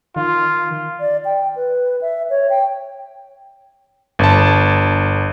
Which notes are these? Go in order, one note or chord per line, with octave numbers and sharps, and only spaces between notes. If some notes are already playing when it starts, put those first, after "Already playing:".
D#3 F4
D5
G5
B4
E5
C#5
G5
G1 A5